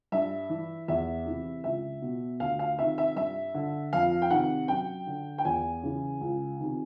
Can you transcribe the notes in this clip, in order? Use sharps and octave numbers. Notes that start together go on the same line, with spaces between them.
G2 E5
E3
E2 E5
C3 E3
C#2 E5
B2
D2 F5
F5
C3 D#3 E5
E5
G2 E5
D3
F2 F5
G5
C3 D#3 F#5
F#2 G5
D3
G5
E2 G#5
C#3 E3
C#2
C3 D#3